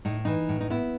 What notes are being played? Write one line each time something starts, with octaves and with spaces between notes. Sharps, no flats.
A2 D#4
E3 D#4
A2
D#4
B3 E4